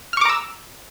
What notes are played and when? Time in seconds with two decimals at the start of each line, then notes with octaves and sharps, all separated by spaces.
0.13 F6
0.17 C#6
0.21 D6
0.25 A#5
0.29 E6